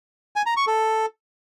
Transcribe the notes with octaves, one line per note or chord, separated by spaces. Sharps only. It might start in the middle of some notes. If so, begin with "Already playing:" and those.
G#5
A#5
C#6
A4